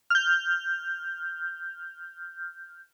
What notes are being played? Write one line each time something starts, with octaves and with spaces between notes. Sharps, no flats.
F6 G6